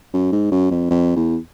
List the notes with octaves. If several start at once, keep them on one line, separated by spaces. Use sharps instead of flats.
F#2
G#2
F#2
F2
F2
E2